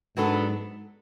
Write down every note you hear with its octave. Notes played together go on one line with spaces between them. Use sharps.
G#2 F#3 B3 D4 A4